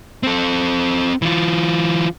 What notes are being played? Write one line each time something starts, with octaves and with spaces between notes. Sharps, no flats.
C4 A4
E3 F4